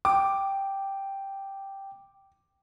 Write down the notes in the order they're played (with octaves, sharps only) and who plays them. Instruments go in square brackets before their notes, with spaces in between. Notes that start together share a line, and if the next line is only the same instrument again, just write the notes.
[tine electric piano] G5 [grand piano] D6